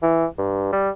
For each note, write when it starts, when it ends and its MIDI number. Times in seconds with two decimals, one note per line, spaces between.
0.03 0.26 52
0.38 0.71 43
0.73 0.90 55